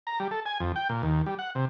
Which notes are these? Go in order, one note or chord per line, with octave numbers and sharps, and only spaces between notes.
A#5
G3
A4
G#5
F2
G5
A#2
D#2
G3
F#5
C3